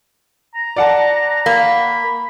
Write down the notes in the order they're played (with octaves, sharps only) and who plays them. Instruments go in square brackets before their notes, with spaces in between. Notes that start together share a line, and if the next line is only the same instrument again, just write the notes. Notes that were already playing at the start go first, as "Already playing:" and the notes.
[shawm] A#5
[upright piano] D5 F#5 A5
[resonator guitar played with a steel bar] A#3 [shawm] B5